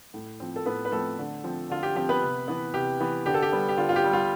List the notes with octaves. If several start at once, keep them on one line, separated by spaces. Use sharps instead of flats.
A2
F3 C4
A4
A2 B3 B4
B4
F3 A3 C4 A4
D3
F3 C4
D3 F4
G4
F3 C4 G4
B3 B4
C3
E3 B3
C3 G4
E3 B3
D3 G4
A4
G4
G3 B3
G4
D3 F4
F4
G4
G3 B3
F4